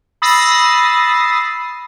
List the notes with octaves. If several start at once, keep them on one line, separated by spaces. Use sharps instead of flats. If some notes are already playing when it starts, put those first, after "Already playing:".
B5 D#6 E6 A6 A#6 C7